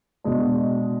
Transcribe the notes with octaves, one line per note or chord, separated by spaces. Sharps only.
B2 G#3 D4